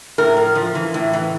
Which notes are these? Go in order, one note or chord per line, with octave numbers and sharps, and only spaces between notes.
A2 A#4
F3
F3
E3
A2
E3